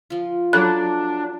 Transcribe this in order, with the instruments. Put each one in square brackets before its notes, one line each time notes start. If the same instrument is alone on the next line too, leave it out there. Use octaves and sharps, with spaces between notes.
[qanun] F3 F4
[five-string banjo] F#3 A4 B5 [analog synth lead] D4 [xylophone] F#6